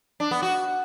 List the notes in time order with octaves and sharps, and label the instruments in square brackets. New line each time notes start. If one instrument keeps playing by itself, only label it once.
[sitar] D4
B3
F#4